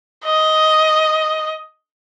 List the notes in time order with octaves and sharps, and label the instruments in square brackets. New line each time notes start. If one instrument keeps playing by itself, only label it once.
[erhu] D#5